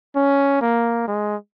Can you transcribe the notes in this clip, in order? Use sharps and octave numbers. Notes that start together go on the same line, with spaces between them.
C#4
A#3
G#3